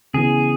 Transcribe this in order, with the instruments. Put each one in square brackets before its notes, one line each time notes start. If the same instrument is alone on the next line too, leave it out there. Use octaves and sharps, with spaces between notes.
[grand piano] C#3 E3 B3 E4 [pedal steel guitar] G#4